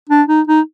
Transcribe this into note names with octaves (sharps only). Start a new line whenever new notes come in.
D4
D#4
D#4